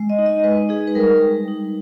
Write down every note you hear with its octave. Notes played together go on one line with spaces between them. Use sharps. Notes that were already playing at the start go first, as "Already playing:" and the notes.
Already playing: G#3
D#5
D#4
D#5
G#3 B4
D#4 G#4
B4
G3 A#4
G3
D#4